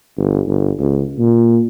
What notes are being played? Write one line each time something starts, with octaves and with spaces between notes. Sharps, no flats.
G1
G1
C#2
A#2